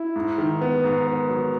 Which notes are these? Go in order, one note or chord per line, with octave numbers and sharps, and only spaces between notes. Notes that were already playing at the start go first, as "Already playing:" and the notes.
Already playing: E4
G#2
D#3
B3
G#2
B3
F#3